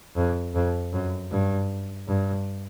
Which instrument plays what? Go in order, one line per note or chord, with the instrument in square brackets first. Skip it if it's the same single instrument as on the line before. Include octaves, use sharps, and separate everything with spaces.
[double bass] F2
F2
F#2
G2
G2